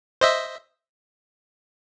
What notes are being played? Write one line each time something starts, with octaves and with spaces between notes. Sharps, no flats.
C5 D#5 E5